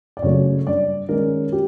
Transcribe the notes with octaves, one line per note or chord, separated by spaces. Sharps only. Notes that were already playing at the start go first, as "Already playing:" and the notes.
D5
C#3 F#3 A3 C#5
G2 D5
D#3 G#3 C#4 A#4
G4